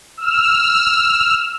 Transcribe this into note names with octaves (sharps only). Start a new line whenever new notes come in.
E6 F6